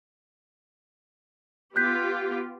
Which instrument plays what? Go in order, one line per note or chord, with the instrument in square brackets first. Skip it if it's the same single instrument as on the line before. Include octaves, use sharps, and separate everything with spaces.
[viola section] B3 F4 G4 [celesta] F#6 G6 B6